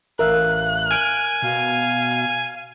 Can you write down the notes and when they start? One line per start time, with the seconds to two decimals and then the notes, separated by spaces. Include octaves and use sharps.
0.19 A1 A#4 E5 F5 F#6
0.91 G#5 F6 D7
1.42 B2 F5